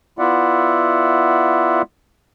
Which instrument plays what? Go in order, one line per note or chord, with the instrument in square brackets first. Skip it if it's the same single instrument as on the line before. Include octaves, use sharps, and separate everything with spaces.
[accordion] B3 E4 F4 D5 E5 F#5